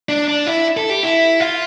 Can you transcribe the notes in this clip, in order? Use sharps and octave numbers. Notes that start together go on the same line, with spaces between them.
D4
D4
E4
A4
G4
E4
F4